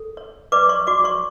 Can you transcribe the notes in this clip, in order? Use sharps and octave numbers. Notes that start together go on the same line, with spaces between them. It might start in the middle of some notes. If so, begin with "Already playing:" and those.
Already playing: A4
C#5
B4 D5 D6
C#5 C#6
F#4 D5 D6
C#5 C#6